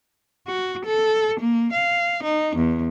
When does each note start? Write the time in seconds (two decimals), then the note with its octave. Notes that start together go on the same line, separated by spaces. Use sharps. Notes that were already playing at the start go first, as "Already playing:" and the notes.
0.48 F#4
0.86 A4
1.40 A#3
1.73 F5
2.24 D#4
2.56 E2